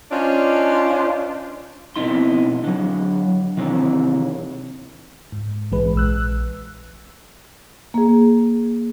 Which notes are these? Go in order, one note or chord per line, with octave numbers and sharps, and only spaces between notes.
C#4 D4 F4 C5 D5 D#5
B2 C4 D#4 E4 C6
D3 F#3
C3 D#3 E3 C4
G#2
A#1 E3 G#3 B4
A#1 E6 F#6
A#3 G#4